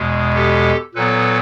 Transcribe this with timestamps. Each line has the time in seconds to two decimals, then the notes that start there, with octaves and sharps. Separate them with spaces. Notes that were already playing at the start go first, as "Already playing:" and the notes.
Already playing: E2 B2 G#3
0.35 G4 A4
0.95 A#2 F#3 B3 A4 B4